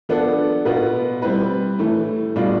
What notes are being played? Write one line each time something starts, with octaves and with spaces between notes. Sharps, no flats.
F3 B3 D4 A4
B2 B3 F4 B4
G3 C4 E4 B4
A2 E3 A3
B2 G3 D4 F4